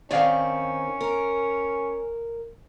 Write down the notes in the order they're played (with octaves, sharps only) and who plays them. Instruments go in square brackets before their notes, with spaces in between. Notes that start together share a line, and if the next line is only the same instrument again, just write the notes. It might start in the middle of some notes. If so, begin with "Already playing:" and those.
[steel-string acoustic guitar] D#3 C4 [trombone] C#4 [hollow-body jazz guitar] C#5 D5 F5
[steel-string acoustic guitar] A#4